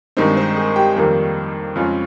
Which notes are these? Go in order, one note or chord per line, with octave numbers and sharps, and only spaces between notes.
G2 D#3 G#3 C4 D#4 C5
C4 C5
G#4
G4 G5
F2 D#3 G3 A#3
F2 C#3 G#3 C#4 F4